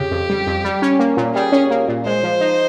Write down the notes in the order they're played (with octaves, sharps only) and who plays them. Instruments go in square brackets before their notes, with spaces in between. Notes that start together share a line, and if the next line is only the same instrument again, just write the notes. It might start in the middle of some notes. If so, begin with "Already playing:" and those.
Already playing: [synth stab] F2 C#3 [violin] G4
[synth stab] F2
G3
F2
G3
C#4
A#3
A#2
[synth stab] G3 [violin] G#4
[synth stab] C#4
A#3
A#2
[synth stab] G#3 [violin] C5
[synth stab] F3
D#4